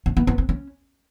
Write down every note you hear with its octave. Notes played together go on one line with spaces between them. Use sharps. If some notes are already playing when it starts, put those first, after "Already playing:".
C#4
B3
B3
C4
C#4